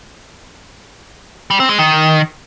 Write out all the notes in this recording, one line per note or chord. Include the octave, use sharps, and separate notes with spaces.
G3
C4
G#3
D#3